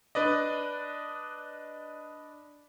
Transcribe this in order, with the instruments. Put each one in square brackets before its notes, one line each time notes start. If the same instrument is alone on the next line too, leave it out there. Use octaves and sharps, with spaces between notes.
[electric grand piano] D4 B4 D5 D#5